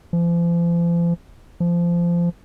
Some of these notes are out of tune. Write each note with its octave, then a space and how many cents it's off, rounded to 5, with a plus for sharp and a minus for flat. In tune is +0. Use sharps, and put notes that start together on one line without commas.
F3 -40
F3 -20